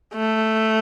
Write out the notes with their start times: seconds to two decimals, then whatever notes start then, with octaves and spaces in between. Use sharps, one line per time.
0.14 A3